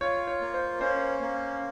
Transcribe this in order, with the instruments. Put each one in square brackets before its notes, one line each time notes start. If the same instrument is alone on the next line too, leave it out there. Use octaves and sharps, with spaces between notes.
[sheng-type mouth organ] F4 [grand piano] C#5
[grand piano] C#5
[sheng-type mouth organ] A#3
[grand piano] C5
[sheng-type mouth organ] C#4 [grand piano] C5
[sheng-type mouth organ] A#3